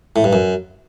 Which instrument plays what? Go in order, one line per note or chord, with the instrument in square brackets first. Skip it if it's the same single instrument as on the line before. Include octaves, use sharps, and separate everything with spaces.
[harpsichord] A2
G2
F#2